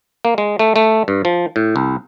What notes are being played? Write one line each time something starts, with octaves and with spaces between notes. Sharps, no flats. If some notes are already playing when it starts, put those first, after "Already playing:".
A#3
G#3
A3
A3
G2
F3
A2
C2